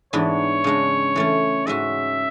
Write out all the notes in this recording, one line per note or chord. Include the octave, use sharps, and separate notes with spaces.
G#2 E3 B3 D4 C#5
C#3 G#3 D4
E3 A3 C#4
G#2 G#3 C#4 F#4 E5